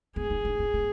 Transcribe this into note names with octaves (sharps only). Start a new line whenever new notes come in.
B3 G#4
D#4
D4
C4
B3